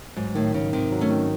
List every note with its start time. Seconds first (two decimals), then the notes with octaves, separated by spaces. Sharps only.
0.17 G#2 F#3
0.35 A2 D#3
0.54 G#2 C#3
0.73 C3 D#3 C4
0.92 F#3
1.01 A3 C#4
1.10 D#3